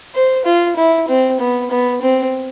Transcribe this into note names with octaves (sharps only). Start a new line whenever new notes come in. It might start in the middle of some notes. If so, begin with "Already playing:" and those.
C5
F4
E4
C4
B3
B3
C4